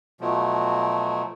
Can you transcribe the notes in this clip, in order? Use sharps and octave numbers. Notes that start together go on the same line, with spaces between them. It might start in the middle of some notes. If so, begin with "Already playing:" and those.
B2 F3 F#3 A3